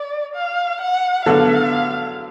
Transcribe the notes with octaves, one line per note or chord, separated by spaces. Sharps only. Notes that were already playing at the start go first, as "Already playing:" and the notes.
Already playing: D5
F5
F#5
D3 F#3 B3 F#4 A4 F5